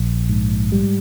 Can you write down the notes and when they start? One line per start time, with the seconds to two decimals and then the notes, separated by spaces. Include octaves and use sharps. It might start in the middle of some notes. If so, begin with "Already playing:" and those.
Already playing: A#1
0.29 G#2
0.72 G3